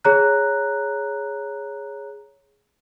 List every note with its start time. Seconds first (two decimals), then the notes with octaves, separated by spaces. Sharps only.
0.05 G#4 C#5 A#5 F#6